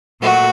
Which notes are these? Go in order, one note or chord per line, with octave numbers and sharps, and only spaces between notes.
A#2 F#3 A3 F#4